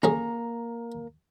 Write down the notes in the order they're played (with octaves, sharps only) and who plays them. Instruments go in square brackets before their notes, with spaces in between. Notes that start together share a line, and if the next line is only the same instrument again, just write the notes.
[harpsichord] D3 C#4 G#4 [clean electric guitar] A#3 A#5